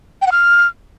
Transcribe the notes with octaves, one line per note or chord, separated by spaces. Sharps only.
G5
F#5
F6